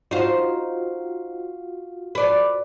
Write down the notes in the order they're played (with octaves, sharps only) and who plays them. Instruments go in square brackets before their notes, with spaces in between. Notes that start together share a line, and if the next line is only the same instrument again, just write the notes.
[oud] D#4 C5 [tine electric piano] F4 F#4 F5
[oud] B4 D5